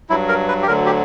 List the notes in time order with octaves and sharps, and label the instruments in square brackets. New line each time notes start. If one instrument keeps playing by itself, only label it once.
[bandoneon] G2 F#3 E4
A#4
B4
G4
D2 D3 F#3 A#4
G4